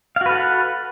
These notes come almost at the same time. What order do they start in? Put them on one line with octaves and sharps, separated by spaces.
F5 F#4 B4 A4 F#5